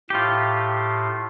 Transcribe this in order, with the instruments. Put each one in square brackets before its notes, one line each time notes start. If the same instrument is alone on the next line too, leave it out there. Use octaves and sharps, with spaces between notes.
[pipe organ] A2 [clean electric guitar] F4 G4